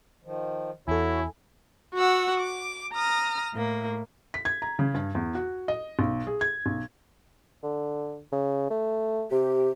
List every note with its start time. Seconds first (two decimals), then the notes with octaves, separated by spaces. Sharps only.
0.24 D#3 F3
0.88 E2 E4 F#4 A4 C#5 G#5
1.94 F#4 F#5 E6
2.38 D6
2.93 A#5 D#6 F6
3.53 A2 A#3
4.34 B6
4.45 G#6
4.62 A#5
4.79 C#3
4.94 G2
5.15 E2
5.35 F#4
5.68 D#5
5.99 B1
6.27 G#4
6.41 G#6
6.66 B1
7.63 D3
8.32 C#3
8.70 A3
9.31 C3 G4